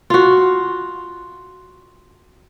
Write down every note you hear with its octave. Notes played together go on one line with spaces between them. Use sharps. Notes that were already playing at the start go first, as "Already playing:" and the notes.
F4 F#4